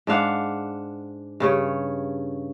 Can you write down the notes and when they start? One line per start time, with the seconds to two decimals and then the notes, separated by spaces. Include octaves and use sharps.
0.07 G#2 D4 F5 F#5
1.40 G2 C#3 C#5